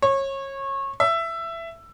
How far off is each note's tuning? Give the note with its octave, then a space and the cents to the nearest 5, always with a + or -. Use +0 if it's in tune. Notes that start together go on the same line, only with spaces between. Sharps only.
C#5 -25
E5 +15